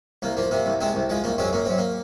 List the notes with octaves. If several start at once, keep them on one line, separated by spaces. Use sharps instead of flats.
C2 A#3
F3 A#3
C3 A#3
C2
C3 G#3 C4
C2
F3 G#3
C2 A#3
F#2 G#3 C4
F#2 A#3
F#2 C4
A#3